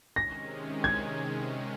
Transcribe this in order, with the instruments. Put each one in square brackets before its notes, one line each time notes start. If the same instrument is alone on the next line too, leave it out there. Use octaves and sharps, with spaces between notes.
[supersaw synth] C3 D#3 G#3 C#4 [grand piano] A#6
[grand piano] G#6